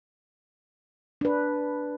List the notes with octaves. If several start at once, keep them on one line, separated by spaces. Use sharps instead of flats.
D4 B4